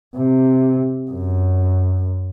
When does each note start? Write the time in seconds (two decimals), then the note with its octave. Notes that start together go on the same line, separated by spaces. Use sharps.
0.16 C3
1.11 F#2